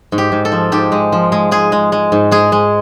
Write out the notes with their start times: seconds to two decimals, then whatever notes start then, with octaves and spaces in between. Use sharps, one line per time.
0.12 G#2
0.18 G4
0.32 G#2
0.45 A4
0.52 F3
0.72 G#2 G4
0.92 G#3
1.12 F3
1.32 G#3
1.51 G#3 G#4
1.72 G#3
1.92 G#3
2.12 G#2
2.31 G#3 G#4
2.52 G#3